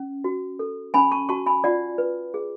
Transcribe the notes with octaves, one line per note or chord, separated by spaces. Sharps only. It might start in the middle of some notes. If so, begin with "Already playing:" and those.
Already playing: C#4
F#4
A4
C#4 G#5 B5
A5 C#6
F#4 A5 C#6
G#5 B5
F4 D5 F#5
B4
G#4